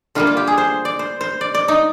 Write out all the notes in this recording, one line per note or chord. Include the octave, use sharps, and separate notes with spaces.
D3 G3 A#3 F4
F4
G4
G#4
C5
D5
C5
C5
D5
D5
D#4